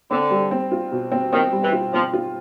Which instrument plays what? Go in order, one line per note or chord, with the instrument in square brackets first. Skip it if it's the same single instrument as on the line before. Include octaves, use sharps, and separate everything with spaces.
[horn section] D3 [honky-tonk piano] C4
[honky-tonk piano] G3
C4
F4
B2
C4
[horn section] D#3 [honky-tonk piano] C4
[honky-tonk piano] G3
[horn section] E3
[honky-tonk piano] F4
[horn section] F3 [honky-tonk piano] C4
[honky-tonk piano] F4